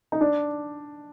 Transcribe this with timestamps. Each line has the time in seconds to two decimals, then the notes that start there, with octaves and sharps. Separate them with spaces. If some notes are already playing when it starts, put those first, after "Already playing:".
0.12 D#4
0.21 D4